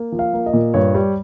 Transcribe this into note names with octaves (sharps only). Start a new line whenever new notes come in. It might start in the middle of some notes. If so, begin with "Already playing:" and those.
Already playing: A#3
F3
F5
A#3
D#5
A#2
G2 C#5
G3